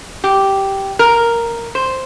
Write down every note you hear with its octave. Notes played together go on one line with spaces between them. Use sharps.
G4
A#4
C5